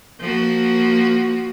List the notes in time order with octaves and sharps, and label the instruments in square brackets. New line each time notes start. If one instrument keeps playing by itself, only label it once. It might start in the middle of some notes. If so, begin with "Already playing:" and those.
[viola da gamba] F3 A#3 F#4